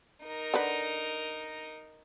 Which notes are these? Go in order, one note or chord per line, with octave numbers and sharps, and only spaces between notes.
D#4 A#4
D3 B4